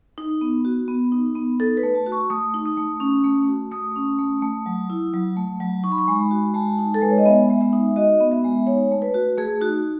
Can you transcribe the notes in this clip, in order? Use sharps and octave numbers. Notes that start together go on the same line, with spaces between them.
D#4
B3
F#4
B3
D#4
B3
D#4 A4
B4
A3
A5
F#4
C#6
A3 D#6
D#4
D#6
A3
C#4
A3
F#4
A3 D#6
C#4
A3
A3
F#3
E4
F#3
A3
F#3
D#4 C#6
B5
C#6
G#3
B5
F#4
G#3 A5
D#4
A4
G#3 B4
C#5
D#5
B3 E5
G#3
E5
D#4
F#4 D#5
B3
E5
G#3
D#4 C#5
A3
B4
F#4
A3 G#4
D#4 F#4